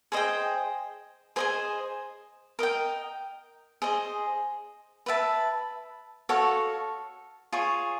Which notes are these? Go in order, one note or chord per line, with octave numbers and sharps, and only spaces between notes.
G#4 C5 D#5 G5
G#4 C5 D#5 G#5
A#4 D#5 G5
G#4 C5 D#5
B4 E5 A5
F#4 A4 C#5 F5
F4 G#4 C#5